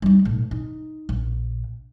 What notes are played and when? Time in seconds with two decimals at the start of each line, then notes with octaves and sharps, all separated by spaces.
0.02 G3 D#4
0.25 B1 A2
0.51 D#4
1.09 A#1